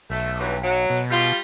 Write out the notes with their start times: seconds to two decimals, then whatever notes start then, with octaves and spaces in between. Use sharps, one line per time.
0.10 B1 A3
0.40 G2 E3 F#3
0.62 F#3
0.90 B2
1.11 G3 F4